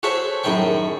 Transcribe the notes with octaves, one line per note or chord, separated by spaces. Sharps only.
F#4 G#4 A4 C5 C#5 E5
F#2 A2 D#3 G#4 G5 C#6